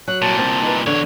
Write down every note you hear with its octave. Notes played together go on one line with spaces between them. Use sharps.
F#3 F#6
C2 A#2 A5
C4
D#4 B4
E2 D3 C#5